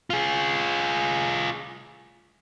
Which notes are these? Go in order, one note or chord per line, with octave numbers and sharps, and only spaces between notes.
F4 G#4